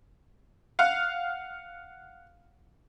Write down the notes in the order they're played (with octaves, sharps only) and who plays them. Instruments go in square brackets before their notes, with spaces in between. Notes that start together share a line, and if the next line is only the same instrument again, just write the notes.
[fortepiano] F5 F#5